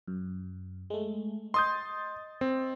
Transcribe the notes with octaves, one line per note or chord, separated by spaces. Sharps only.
F#2
G#3 A3
D#5 C6 D#6 G6 A6
C4